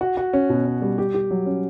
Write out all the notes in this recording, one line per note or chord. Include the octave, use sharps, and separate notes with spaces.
F#4
F#4
C#4
B2
C#4
G3
G4
G4
F#3
C#4